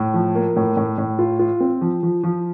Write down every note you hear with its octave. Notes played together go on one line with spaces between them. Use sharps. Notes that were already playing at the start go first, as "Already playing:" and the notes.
Already playing: A2
F3
A#3
A2
A2
A2
F4
F4
C4
F3
F3
F3